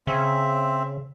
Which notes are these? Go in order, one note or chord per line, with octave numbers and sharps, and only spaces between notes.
C#3 C4 E5